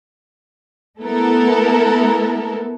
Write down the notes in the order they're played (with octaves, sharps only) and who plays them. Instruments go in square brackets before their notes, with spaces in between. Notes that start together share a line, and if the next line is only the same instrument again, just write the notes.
[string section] A3 B3 E4 A4 A#4